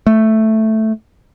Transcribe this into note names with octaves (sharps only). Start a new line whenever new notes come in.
A3